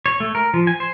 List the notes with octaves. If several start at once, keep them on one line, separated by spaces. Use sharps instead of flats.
C#5
A3
A#4
F3
G#5
C5